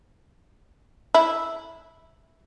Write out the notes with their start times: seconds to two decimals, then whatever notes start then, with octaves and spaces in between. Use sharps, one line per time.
1.15 E4